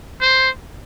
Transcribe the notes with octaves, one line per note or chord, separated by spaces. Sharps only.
C5